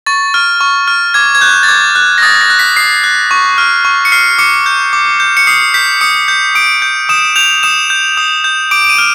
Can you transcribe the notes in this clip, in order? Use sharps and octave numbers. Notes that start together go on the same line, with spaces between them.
C#6 A6
F6
C#6
F6
D6 G#6
G#6
F#6 G6
A6
D6 G#6
F#6
A#6
D#6 A6
A#6
F#6
B6
D#6 C7
F#6
C#6
F6
C#6
C#7
F6 C7
D6 C#7
G6
D6
G6
C#7
D#6 C7
G6 B6
D#6 C#7
G6
D#6 D7
G6
D#6 E7
G6 F7
D#6 E7
G6
D#6
G6
D6 D7
D7
D#7
F6